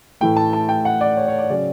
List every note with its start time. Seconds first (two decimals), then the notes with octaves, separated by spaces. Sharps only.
0.21 A2 E3 A3 G5
0.37 A5
0.53 A5
0.69 G5
0.85 F#5
1.01 D5
1.17 C#5
1.28 C#5
1.39 D5
1.49 C#3 F#3 C#4 D5